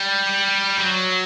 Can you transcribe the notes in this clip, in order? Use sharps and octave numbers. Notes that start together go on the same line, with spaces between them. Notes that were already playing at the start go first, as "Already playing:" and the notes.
Already playing: G3
F#3